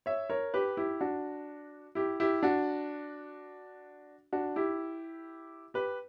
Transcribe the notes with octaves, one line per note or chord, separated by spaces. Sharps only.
C#5 E5
A#4 C#5
G4 B4
E4 G4
D4 F#4
E4 G4
E4 G4
D4 F#4
D4 F#4
E4 G4
G4 B4